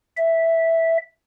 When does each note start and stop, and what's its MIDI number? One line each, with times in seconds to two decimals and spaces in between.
0.17 0.97 76